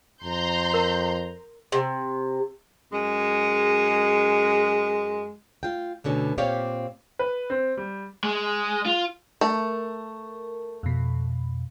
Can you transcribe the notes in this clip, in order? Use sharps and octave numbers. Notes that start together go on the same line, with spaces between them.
F2 A#5 C6 G6
A#4
C3
F#2 G#3
F4 G5
D2 B2 D3 C#4
A#2 C4 G4 C#5 D5 F5
B4
C4
G3
G#3
F4
A3 A#4
F2 B2